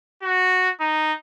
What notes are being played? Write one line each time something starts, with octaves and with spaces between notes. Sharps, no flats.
F#4
D#4